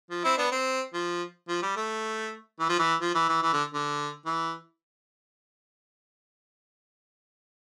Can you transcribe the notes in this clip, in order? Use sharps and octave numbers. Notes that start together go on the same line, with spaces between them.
F3
C4 E4
B3 D4
C4
F3
F3
G3
A3
E3
F3
E3
F3
E3
E3
E3
D3
D3
E3